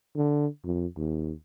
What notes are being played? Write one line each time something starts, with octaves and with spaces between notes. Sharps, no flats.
D3
F2
D#2